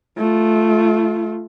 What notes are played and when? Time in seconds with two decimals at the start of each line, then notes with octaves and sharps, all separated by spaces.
0.17 A3 F4